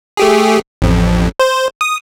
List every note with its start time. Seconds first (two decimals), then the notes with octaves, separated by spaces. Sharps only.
0.17 A3 G4 G#4
0.82 A1 F2
1.40 C5
1.81 D#6